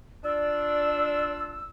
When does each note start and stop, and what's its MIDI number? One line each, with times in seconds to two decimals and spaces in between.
0.24 1.69 62
0.24 1.69 65
0.24 1.32 74
0.24 1.69 88